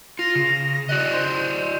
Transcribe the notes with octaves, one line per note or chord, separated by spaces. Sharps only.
F4 A#6
C#3
F#4 D5 D#5 F#6
C5